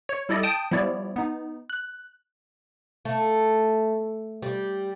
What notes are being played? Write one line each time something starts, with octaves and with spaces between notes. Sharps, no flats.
C#5
G3 E4 A4 D5 D#5
G5 A5 D#6
F3 G3 B3 E4 C#5 D5
B3 D#4
F#6
A3
G3